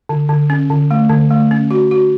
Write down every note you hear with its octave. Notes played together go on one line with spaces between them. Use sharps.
D3
D3
C#4
D3
A3
D3
A3
C#4
F#4
F#4